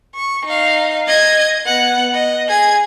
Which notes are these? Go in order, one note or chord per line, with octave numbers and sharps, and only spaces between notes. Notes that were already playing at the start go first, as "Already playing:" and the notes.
C#6
D#4 F5
D#5 G#6
B3 F#5
D#5
G#4 G#6